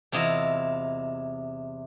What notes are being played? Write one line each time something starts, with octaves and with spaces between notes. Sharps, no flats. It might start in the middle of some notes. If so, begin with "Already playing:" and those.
E2 C3 E4 F4 D#5 A#5